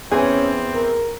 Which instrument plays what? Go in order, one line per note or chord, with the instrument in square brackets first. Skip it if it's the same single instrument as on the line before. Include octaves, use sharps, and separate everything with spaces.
[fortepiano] E2 G#5 [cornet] C4 [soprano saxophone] C#4 [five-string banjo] G#4
[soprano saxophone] A#4